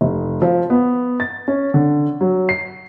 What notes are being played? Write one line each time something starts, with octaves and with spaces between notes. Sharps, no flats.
F1
F3
B3
A6
C#4
D3
F#3
C7